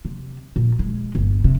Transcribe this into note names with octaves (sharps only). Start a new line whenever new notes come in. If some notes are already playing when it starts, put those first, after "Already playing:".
C3
A#2
G#3
G1
C3